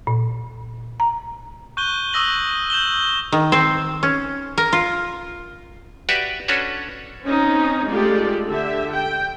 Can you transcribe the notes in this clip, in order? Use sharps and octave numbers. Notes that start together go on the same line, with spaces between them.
A#2
A#5
C#6 F#6 G6 D#7 G7
C#6 D#6 E6 A#6 F#7
G6 E7 F#7 G7
D#3
C4
C#4
A#4
F4
F#4 G4 B4 D5 E5 F#5
C#4 D4 F#4 A4 B4 C#5
C4 C#4 D#4
G#3 A3 F4 G4 A4 D5
D3 G4 E5
G5